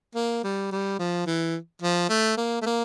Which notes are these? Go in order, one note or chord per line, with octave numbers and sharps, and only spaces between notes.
A#3
G3
G3
F3
E3
F3
A3
A#3
A3
A#3